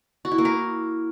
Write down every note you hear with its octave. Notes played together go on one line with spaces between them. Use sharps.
F#4
E4
A#3
A#4